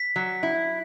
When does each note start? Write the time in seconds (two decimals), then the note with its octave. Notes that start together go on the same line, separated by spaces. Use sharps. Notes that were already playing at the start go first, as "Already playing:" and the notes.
Already playing: B6
0.16 F#3
0.43 E4